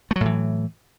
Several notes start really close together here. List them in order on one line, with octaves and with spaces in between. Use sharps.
A3 F#3 A2 E3